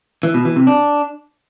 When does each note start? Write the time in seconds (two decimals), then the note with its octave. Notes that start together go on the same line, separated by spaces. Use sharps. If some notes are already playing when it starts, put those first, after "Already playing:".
0.23 E3
0.34 B2
0.45 E3
0.56 C3
0.67 D4